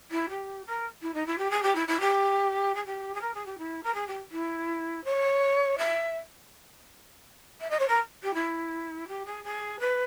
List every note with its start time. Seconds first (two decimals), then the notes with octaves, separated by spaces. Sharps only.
0.11 E4
0.29 G4
0.65 A#4
1.02 E4
1.14 D#4
1.26 E4
1.38 G4
1.50 G#4
1.62 G4
1.75 E4
1.87 E4
2.00 G4
2.75 G#4
2.85 G4
3.14 G#4
3.21 A#4
3.34 G#4
3.45 G4
3.58 E4
3.83 A#4
3.94 G#4
4.07 G4
4.31 E4
5.04 C#5
5.78 E5
7.60 E5
7.70 D#5
7.79 C#5
7.88 A#4
8.22 G4
8.34 E4
9.07 G4
9.25 G#4
9.43 G#4
9.79 B4